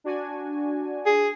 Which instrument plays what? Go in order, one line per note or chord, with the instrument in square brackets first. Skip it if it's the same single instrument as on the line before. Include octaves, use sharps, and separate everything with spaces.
[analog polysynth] D4 F#4 G#5
[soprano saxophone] G#4